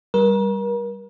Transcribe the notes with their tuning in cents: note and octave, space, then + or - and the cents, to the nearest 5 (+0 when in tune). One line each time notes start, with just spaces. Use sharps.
G3 +0 A#4 +40